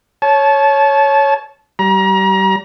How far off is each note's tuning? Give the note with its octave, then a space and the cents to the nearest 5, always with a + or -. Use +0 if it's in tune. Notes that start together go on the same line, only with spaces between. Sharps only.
C#5 +0 A5 -25
G3 -30 A#5 +30